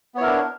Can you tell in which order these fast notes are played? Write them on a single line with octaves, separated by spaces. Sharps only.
B3 C#5 E4 A#4 D4